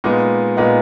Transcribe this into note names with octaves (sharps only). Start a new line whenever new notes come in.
A#2 G#3 B3 D#4
A#2 G#3 B3 D#4